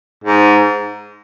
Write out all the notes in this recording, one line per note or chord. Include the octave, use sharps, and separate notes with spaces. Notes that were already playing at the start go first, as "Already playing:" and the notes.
G#2